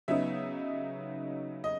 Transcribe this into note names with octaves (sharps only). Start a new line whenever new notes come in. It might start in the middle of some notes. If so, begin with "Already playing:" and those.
C#3 F#3 B3 D#4 E5
D#5